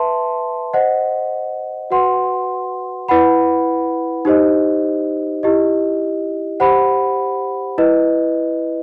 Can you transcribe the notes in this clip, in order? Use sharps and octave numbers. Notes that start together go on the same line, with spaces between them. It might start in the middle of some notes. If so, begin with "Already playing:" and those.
Already playing: B4 E5 A5 C6
C5 D#5 F#5
F#4 B4 F#5 C6
E4 B4 F#5 B5
D#4 G4 C5 D#5
E4 G4 D#5
G4 C5 F#5 B5
E4 B4 D#5